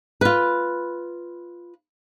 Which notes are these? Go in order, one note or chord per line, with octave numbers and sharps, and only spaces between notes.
F4 B4